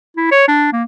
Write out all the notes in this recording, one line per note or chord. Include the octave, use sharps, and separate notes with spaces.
E4
C#5
D4
A#3